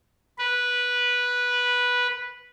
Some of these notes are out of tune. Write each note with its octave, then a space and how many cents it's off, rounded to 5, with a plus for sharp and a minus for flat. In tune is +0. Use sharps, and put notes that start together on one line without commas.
B4 -10